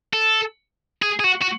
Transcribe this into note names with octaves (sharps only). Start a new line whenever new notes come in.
A4
G#4
G#4
F#4
F#4